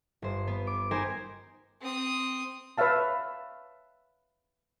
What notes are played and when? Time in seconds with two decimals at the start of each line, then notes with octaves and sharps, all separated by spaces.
0.22 G1 C5
0.47 B3
0.67 D6
0.91 D#4 G4 A#4 C5 G#5
1.81 C4 D#6
2.78 B4 C#5 E5 F5 A5